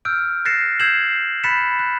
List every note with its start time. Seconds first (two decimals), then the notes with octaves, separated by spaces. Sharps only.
0.05 E6 F6 G6 D7
0.45 F#6 A6 A#6 C7 C#7 E7
0.80 E6 G6 G#6 C7 E7 F#7
1.44 B5 F#6 A6 B6 C#7 E7
1.79 F#6